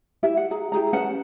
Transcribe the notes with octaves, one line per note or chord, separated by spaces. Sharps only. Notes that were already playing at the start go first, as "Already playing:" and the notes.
E4 G4 E5
F#5
G#4 A#5
E4 G4 G#4 A#5
C#4 B4 F#5 A5